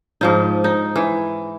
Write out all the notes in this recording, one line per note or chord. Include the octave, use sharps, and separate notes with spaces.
G#2 F3 D#4
D#4
E3